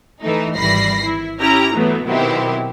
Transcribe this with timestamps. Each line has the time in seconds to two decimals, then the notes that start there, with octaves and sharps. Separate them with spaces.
0.21 E3 A3 D#4
0.56 G#1 E3 G3 B5 A#6 C7
1.04 E4
1.39 C#4 E4 G4 A#5
1.74 E3 F#3 A3 B3
2.05 B2 D#3 F#3 C4 E4 G4